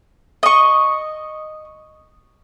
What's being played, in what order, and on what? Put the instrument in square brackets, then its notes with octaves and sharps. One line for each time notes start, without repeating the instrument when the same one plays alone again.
[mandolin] D#5 C#6